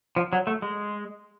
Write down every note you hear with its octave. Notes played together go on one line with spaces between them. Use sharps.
F3
F#3
A3
G#3